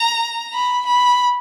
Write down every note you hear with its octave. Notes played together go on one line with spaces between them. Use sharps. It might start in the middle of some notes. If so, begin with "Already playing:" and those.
Already playing: A#5
B5
B5